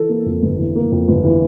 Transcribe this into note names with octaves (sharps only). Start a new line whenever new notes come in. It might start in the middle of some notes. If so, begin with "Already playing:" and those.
Already playing: E3 A4
A#3
F2
G1
E3
A#3
F2
G1
E3